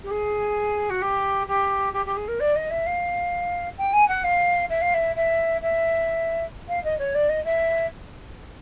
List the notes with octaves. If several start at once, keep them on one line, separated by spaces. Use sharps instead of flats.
G4
G#4
F#4
G4
G4
G4
G4
G#4
A#4
D5
D#5
E5
F5
G5
G#5
F#5
F5
E5
F5
E5
E5
E5
F5
D#5
C#5
D5
D#5
E5